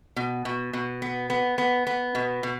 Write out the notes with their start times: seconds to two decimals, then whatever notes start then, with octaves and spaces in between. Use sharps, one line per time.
0.16 B2
0.45 B2
0.73 B2
1.02 B3
1.30 B3
1.58 B3
1.87 B3
2.15 B2
2.43 B2